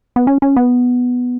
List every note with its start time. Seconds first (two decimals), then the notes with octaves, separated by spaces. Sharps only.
0.16 B3
0.27 C#4
0.42 C#4
0.56 B3